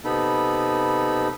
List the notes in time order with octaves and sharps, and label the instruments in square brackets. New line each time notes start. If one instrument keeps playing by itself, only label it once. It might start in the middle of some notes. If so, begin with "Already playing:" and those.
[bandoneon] C3 B3 D#4 A4 B5